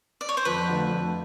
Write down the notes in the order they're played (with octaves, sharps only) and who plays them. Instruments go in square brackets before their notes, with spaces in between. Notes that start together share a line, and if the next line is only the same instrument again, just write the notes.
[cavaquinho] D5
C#5
C5
[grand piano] F2 [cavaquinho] B4
[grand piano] D3 F3 A3
F2